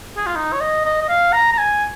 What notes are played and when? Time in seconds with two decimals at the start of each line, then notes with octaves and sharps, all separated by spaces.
0.17 G#4
0.26 F4
0.36 D#4
0.53 C#5
0.60 D#5
0.85 D#5
1.02 D#5
1.09 F5
1.33 A#5
1.53 A#5
1.58 G#5